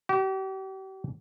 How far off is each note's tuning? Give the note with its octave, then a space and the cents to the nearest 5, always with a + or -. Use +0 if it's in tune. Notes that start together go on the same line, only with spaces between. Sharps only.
G4 -40